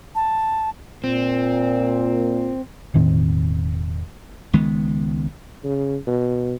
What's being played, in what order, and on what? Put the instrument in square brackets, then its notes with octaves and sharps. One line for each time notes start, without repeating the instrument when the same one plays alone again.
[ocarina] A5
[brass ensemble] A#2 [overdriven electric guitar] C4
[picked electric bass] E1 A2 D#3 C4
[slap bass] C#2 D#3 G#3 B3
[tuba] C#3
B2